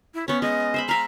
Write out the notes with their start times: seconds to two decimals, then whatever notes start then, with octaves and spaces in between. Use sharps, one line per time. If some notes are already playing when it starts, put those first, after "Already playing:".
0.14 E4
0.28 B3 C#4 C#5
0.42 G#3 D#5
0.74 C5 E5 B5
0.89 E5 F5 A#5